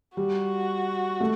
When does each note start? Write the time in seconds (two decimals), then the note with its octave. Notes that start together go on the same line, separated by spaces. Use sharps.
0.17 G3 F#4
1.20 A3